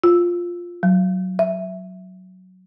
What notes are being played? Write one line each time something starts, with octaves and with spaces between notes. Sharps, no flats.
F4
F#3
E5